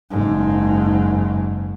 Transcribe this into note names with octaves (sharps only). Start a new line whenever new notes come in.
F#1 G#2